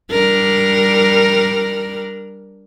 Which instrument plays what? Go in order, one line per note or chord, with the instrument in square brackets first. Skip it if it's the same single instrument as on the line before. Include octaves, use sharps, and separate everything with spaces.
[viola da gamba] G3 D4 A#4